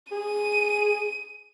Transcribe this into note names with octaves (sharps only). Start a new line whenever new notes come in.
G#4 D#7